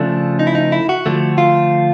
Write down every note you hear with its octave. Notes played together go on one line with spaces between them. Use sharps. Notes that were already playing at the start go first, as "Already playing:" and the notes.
Already playing: C#3 F3 A3 D4
D#4
E4
D#4
E4
F#4
D3 F3 A3
F4